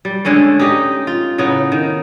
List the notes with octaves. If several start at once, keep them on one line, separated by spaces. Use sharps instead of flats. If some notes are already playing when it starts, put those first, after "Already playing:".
G3
D3 G#3 A3 C#4
D#4 G4 D#5
F4
A2 C#3 B3 D#4
D#3